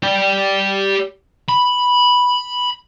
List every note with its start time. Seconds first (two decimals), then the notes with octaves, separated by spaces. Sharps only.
0.03 G4 D5
1.49 B5